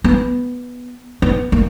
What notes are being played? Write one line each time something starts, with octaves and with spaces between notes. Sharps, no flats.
B3
B3
A#3